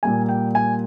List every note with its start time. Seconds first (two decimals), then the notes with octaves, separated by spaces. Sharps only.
0.03 A#2 G3 A#3 G#5
0.29 G5
0.55 G#5